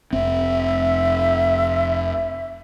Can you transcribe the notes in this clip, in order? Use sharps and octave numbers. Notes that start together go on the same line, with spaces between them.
F1 C4 E5